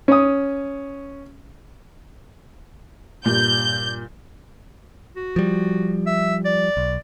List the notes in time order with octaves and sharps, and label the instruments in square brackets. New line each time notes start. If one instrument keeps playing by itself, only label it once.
[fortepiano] C#4 D#6
[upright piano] G2 A#2 [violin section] G6
[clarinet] F#4
[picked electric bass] F3 G3
[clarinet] E5
D5
[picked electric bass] B1